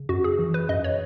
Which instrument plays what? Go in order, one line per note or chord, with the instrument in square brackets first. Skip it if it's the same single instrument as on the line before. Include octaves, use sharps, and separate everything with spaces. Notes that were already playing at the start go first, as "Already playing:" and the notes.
Already playing: [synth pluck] C#3
F#2 F#4
G#4
E3
B4
F#2 D#5
C#5